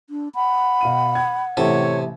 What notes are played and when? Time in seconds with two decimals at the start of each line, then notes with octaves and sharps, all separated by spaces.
0.10 D4
0.35 F#5 B5
0.81 B2 F5 D#7
1.15 G#6
1.57 A1 C3 E3 A4 C#5